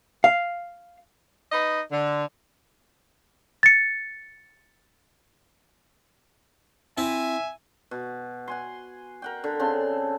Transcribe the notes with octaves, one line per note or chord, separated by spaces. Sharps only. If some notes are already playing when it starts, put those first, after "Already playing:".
F5
D#4 B4 D#5
D3
A6 C#7
C4 E4 E5 G#5
B2
F#5 G#5 C6
A#4 F#5 G5
D3
C#3 C4 A4 C6